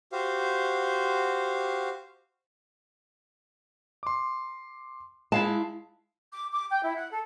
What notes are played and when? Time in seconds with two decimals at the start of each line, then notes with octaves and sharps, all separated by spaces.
0.12 F#4 G4 C5 F5
4.03 C6 D6
5.32 G#3 E4 F5 A5
6.32 D6
6.51 D6
6.70 G5
6.84 E4
6.95 F#5
7.11 A4